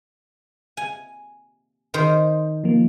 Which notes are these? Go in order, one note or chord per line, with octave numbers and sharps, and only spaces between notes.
G#5
D#3 C5
F3 A#3